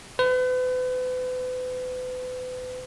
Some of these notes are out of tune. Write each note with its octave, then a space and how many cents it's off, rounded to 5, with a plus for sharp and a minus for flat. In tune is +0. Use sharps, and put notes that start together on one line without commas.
B4 +40